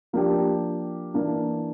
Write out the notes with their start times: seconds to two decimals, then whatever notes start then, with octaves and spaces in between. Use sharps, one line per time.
0.13 F3 A#3 D4 G4
1.14 E3 A#3 D4